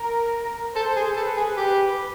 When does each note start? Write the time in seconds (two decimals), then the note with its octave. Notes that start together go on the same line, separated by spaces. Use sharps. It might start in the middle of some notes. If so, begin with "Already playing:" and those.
Already playing: A#4
0.75 A4 C5
0.96 G#4
1.16 A4 B4
1.37 G#4
1.57 G4